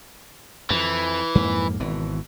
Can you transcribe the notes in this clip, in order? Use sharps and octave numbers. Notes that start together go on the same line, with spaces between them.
F2 E3
F2 G#2 A#3
G#1 B2 E3